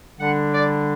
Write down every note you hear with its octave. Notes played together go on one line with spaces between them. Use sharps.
D3 G3 D4 F#5
D5